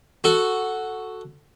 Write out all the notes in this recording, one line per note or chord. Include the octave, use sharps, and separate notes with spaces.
F#4 A4